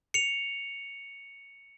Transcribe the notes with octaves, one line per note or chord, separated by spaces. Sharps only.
C#7 F7